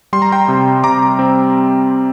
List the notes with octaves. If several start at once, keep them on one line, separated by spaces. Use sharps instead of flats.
G3 C6
A#5
G5 C6
C3
C3 A#5 D6
C4